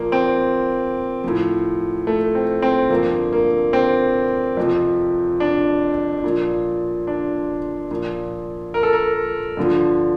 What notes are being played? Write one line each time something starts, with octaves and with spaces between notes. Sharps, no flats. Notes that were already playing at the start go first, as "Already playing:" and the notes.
Already playing: A#2 F3 A#3
C4
A2 F3
A3
C4
C4
G2 D3 F3 A#3
A#3
C4
F2 C3 F3
D4
A#2 F3
D4
A#2 F3
A#4
A4
A#4
G2 D3 F3